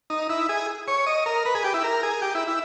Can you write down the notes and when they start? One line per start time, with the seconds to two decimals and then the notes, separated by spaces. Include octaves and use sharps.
0.10 D#4
0.29 E4
0.49 G#4
0.88 C#5
1.07 D#5
1.26 A#4
1.45 B4
1.55 G#4
1.64 G4
1.74 E4
1.84 A#4
2.03 G#4
2.22 G4
2.35 E4
2.48 E4